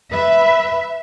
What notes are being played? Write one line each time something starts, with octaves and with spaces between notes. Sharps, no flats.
B4 E5